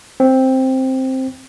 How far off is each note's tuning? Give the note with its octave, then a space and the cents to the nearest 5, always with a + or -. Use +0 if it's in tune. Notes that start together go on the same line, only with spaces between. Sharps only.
C4 +5